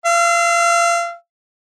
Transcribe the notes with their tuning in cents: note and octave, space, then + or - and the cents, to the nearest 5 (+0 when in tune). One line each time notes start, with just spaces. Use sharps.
F5 -30 E6 +0